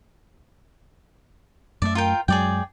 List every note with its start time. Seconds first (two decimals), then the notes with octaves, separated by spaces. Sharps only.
1.82 F#2 A3 D5 E5
1.95 F4 A#4 G5
2.28 F#2 F#3 G#3 G#4 D5 G5